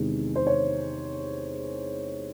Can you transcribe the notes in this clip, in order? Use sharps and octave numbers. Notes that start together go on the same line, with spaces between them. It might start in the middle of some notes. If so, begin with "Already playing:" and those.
Already playing: E2 C3 D#3 G#3
C5
C#5